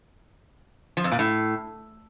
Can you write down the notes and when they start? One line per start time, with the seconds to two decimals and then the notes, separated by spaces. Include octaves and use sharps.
0.97 F3
1.04 F2
1.12 A#2
1.19 A2